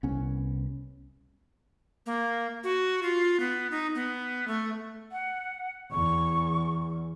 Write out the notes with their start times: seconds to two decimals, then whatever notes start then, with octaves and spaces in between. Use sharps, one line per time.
0.03 C2 B3 C#4
2.06 A#3
2.64 F#4
3.03 F4
3.40 B3
3.71 D#4
3.95 B3
4.48 A3
5.12 F#5
5.92 E2 C#6